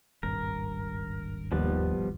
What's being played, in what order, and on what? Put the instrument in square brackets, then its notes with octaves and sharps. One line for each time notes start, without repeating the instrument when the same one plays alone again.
[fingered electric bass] D#1 G#1 G2 [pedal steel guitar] A#4
[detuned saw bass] D#2 [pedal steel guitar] F3 G3 B3